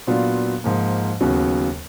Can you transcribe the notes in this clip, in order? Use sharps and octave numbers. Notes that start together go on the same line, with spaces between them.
A#2 F#3 B3 D4 F4
G#2 F3 A#3
D#2 C#3 F#3 B3